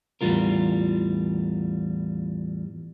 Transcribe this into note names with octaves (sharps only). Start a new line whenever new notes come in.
E2 A2 E3 G3 F4 A#4